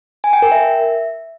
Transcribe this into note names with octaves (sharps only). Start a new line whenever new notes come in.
G#5
G5
A#4
E5